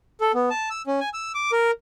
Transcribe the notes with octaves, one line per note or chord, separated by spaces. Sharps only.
A4
B3
A5
E6
C#4
G#5
E6
D6
A#4